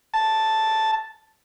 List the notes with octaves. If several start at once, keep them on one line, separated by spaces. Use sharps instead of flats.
A5